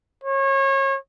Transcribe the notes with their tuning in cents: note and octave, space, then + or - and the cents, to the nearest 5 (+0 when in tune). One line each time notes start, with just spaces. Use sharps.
C#5 -30